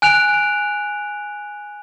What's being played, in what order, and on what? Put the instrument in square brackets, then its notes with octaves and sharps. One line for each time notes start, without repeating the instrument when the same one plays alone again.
[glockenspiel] G#5 F#6 D7 F7